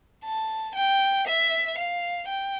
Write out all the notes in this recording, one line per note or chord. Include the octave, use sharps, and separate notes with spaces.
A5
G5
E5
F5
G5